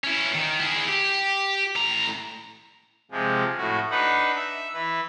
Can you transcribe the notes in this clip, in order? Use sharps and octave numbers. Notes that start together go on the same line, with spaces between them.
C#4 E4
D#3
E4 G#4
G4
A2 A#5
C3 F3 G#3
A2 F#4
D4 D#4 B4 F#5
E5
E3 B4